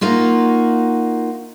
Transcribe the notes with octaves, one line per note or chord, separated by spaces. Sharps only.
A#3 D#4 F4 F#4